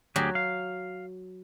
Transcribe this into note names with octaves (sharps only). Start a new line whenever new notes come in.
D2 F#3 G4 G#4
F5